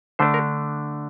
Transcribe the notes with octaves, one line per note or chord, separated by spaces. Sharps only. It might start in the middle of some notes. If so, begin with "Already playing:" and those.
D3 A3 D4 C5
A#4